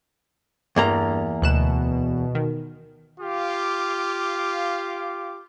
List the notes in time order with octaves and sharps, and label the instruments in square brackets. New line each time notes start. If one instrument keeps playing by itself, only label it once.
[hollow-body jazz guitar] E2 A#3 A#5 [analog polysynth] G2
[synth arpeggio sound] D2 F#6 E7 [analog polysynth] B2
[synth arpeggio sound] D#3
[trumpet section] F4 G4 F5 D6